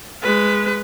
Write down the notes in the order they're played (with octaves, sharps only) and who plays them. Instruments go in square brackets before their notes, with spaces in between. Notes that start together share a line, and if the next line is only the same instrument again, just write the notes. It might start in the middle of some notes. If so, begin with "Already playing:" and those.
[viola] G#3 B4